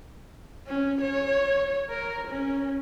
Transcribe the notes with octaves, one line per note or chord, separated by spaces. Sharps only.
C#4
C#5
A#4
C#4